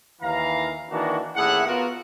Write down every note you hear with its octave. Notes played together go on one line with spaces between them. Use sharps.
D#2 E3 F5 A#5
D#3 E3 A#3 D4 F#4
A1 D#2 A2 G#4 E5 F#5
B3 F4 F#4 A#4